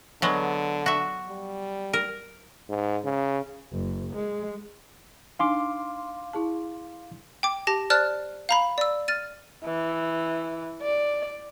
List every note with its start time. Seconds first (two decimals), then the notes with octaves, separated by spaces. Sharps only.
0.22 D3 F#3 G#3 B3
0.86 F#4 E5
1.29 G3
1.93 A#4
2.69 G#2
3.04 C#3
3.72 F#1
4.14 G#3
5.39 D4 D#4 F5 G#5 C6 D6
6.33 E4 G#4 A5
7.43 G5 D6
7.67 G4 A5 A#6
7.90 C5 D5 A5 F6 F#6 A6
8.49 F5 A#5 B5
8.78 D5 E6
9.08 F6 A6 D#7
9.65 E3
10.82 D5